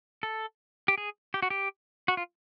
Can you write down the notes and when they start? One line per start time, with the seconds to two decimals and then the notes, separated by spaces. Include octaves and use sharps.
0.23 A4
0.88 G4
0.98 G#4
1.34 G4
1.42 F#4
1.50 G4
2.08 F#4
2.17 F4